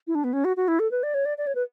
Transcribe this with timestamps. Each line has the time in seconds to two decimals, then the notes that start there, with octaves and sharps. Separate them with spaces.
0.07 E4
0.15 D4
0.24 B3
0.33 C#4
0.44 F#4
0.57 F#4
0.68 E4
0.79 A4
0.91 B4
1.03 D5
1.14 C#5
1.25 D5
1.38 D5
1.47 C#5
1.55 B4